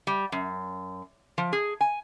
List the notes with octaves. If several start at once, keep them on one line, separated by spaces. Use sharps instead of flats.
G3
F#2
F3
G#4
G#5